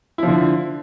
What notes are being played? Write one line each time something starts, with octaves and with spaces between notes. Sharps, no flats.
D3 F3 E4